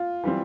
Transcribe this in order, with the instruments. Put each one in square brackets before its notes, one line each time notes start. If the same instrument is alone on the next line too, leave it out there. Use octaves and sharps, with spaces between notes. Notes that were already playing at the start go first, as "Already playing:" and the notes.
Already playing: [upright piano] F4
[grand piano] E3 G3 C4